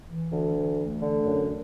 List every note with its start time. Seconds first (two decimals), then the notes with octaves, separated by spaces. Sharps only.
0.08 E3
0.31 D2
0.55 E3
0.78 A3
1.01 D3
1.25 F#2